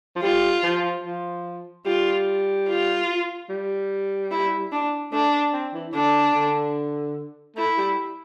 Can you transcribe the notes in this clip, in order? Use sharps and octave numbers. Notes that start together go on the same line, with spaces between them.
F3
G3 F4
F3
F3
G3 F4
F4
G3
E4
D4
A3 D4
C4
E3
D3 D4
D3
A3 E4
G3